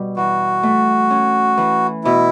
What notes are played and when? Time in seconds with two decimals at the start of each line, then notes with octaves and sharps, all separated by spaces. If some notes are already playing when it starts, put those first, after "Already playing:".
Already playing: B2 G3
0.17 E3 F#4
0.63 A3
1.11 C#4
1.58 E3
2.04 B2 E4